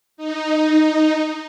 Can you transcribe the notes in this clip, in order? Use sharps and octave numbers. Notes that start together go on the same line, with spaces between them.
D#4